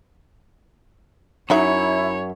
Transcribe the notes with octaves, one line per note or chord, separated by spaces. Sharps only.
F#2 F#3 D#4 E4 C#5 E5